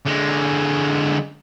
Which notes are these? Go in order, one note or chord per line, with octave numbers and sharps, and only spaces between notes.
D3 G#3